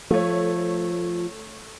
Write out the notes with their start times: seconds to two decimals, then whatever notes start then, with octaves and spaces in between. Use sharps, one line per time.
0.10 F3 A3 C#5